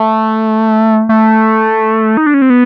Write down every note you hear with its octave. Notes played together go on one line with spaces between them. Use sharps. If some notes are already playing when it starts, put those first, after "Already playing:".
Already playing: A3
A3
D#4
D4
C#4
C4
B3